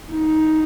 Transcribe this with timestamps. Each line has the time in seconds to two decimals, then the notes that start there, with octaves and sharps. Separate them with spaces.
0.12 D#4